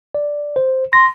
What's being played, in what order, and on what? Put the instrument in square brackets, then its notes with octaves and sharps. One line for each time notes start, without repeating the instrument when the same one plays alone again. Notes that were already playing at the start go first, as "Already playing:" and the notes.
[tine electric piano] D5
C5
[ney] C6 [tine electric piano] A#6